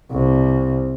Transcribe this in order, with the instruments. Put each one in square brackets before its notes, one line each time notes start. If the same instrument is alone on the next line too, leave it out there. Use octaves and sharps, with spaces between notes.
[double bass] C2